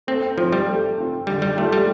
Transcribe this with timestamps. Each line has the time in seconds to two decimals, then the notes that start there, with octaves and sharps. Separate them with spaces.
0.07 A3 C4
0.37 F3 C4 F4
0.52 G3
0.68 A3
0.98 C4 F4
1.27 D3 G3
1.42 G3
1.57 G3 A3 F4 A4
1.72 G3